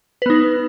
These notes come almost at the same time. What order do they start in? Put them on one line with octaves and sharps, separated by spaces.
B4 B3 D#4